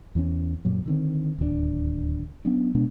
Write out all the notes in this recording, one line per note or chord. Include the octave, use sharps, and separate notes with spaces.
E2 E3 B3 C#4
F#2 A#2 F#3
D3 D#3 C4
D1 D#2 E3 D4
F#3 B3 C#4 D4
B2 G#3 B3 D4